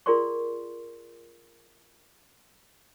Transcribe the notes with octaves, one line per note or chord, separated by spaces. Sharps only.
F4 G#4 A#4 D5 C6 C#6